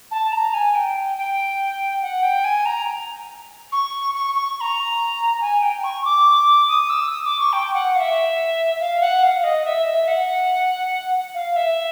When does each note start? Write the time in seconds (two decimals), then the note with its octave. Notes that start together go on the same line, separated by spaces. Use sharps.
0.11 A5
0.31 A#5
0.53 G#5
0.74 G5
1.17 G5
2.02 F#5
2.22 G5
2.44 G#5
2.65 A#5
3.72 C#6
4.14 C#6
4.35 C#6
4.56 C#6
4.60 A#5
5.40 G#5
5.62 G5
5.83 C#6
6.04 D6
6.68 D#6
6.89 E6
7.10 D#6
7.24 D6
7.39 C#6
7.52 G5
7.74 F#5
7.95 F5
7.99 E5
8.80 F5
9.01 F#5
9.22 F5
9.43 D#5
9.64 E5
9.86 E5
10.07 F#5
11.34 F5
11.56 E5